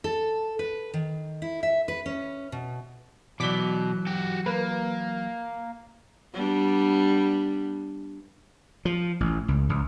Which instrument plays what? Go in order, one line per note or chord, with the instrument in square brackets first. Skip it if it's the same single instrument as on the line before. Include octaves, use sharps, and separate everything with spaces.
[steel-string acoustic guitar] A4
B4
D#3
E4
E5
B4
C#4
B2
[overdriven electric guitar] B2 [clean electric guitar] E3 F#3 [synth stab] D5 D6 B6
[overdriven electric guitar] F#4 G4
[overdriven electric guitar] A#3 [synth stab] A#4 B4
[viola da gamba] G3 B3 D4
[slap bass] F3
A1
C#2
C#2